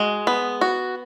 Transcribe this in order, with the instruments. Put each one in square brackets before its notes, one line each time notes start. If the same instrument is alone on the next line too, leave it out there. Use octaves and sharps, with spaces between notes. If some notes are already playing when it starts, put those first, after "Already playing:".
Already playing: [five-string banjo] G#3 F#4
B3
F#4